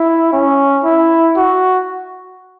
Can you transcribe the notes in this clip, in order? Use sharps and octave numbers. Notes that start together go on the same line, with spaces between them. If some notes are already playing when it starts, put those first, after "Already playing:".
Already playing: E4
C#4
E4
F#4